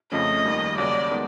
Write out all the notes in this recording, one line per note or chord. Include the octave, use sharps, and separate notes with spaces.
F2 C#3 F3 A3 C#4 D#5
D#2 D#3 G3
D#2 C#3 F#3 D5
D#3 G#3 B3